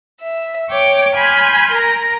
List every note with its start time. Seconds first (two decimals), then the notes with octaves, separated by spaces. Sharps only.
0.21 E5
0.69 C#5 G5 D6
1.14 G#5 B5 C6 F6 G6 G#6
1.70 A#4 A#5